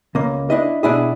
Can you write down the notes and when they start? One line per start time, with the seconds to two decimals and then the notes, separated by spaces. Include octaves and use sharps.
0.15 C#2 A#3
0.50 D4 E4 D#5
0.83 B2 D4 E4 G#4